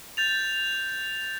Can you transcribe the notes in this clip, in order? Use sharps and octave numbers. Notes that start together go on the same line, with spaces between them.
G6 A6 F7